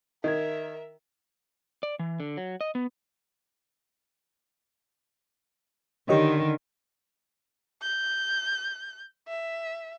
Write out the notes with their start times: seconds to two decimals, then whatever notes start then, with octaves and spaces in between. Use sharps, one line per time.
0.24 D#3 A#4 D#5 E5 G#6
1.83 D5
1.99 E3
2.20 D3
2.37 F#3
2.61 D#5
2.75 B3
6.09 D3 D#3 G4 C#5 D#5
7.82 G6
9.28 E5